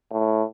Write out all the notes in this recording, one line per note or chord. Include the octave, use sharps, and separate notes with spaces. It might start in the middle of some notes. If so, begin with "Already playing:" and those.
A2